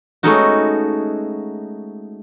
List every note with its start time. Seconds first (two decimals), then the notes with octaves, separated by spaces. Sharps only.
0.23 G#3 A3 B3 C#4 D#4 F#4